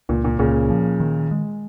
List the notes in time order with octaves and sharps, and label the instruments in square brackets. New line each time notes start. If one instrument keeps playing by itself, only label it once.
[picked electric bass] C#2 [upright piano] A#2
[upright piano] A#2
[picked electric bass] C#2 [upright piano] A#2 C#3
[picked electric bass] F3
D#3
G#3